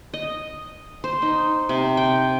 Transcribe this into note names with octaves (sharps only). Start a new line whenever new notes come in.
D#5
C5
D#4
C3
G5